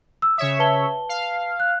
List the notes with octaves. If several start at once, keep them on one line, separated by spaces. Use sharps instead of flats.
E6
C#3 C#5 E5 D#6
B4 A5 G7
F5
F#6